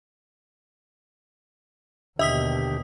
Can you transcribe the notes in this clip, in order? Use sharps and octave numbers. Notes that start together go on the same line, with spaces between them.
D#2 B2 D3 G4 D#5 E5 D#6 B6